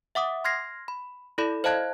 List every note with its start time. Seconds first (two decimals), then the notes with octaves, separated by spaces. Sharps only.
0.15 E5 F#5 D6 D#6
0.44 C6 F6 G#6 A#6 C7
0.88 B5
1.38 E4 A4 D5 B5
1.64 C5 D#5 F5 A5 F#6 G#6